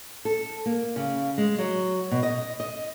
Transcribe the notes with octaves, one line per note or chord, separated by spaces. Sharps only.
A4
A#3
C#3
G#3
F#3
B2
D#5
D#5